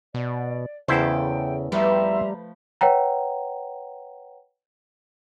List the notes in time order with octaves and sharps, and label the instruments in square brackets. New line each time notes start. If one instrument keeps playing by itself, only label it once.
[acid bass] B2 [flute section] D5
[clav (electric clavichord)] E2 E4 C5 [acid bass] C#3 [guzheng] A4 E5 [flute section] G5
[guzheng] F3 A3 B4 [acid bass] G3 [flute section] E5 A#5 C6
[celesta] B4 C#5 F#5 G5 A#5